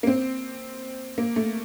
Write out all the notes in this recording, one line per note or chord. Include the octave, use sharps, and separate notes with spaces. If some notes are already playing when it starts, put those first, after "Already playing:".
A#3
C4
A#3
A3